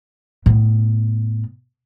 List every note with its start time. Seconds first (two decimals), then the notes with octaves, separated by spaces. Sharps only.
0.46 A2 B3